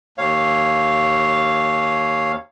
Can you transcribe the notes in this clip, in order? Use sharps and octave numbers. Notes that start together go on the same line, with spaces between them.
D#2 C#5 F5